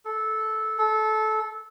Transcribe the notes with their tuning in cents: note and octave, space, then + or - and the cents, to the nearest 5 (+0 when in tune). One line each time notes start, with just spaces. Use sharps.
A4 -15
A4 -20